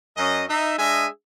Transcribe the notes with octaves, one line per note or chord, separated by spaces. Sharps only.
F#2 C#4 D#5
D#4 E5
G#3 D4 G#4 D#5 E5 G#5